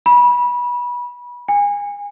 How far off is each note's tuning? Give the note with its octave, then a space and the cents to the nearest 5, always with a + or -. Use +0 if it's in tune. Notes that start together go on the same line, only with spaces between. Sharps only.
B5 -25
G#5 -30